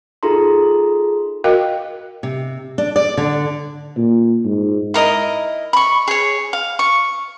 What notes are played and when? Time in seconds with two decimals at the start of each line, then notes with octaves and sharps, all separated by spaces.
0.23 D#4 F4 G#4 A4 A#5 C6
1.44 F#4 A#4 D#5 F5 G5
2.23 C3
2.78 D4
2.96 D5
3.17 D3
3.97 A#2
4.45 G#2
4.94 E4 A#4 D#5 D#6
5.73 B5 C#6
6.08 G#4 C#5
6.53 F5
6.79 C#6